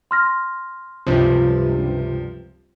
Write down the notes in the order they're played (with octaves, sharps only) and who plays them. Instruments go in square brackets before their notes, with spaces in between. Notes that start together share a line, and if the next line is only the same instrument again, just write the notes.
[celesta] C6 F6 A#6
[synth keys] C#2 G2 C3 [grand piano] F3